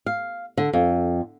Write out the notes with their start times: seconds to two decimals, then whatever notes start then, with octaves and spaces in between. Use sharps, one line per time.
0.06 F5
0.57 D3
0.73 F2